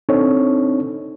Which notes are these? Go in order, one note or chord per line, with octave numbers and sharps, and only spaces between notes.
C4 D4 D#4 A4 C#5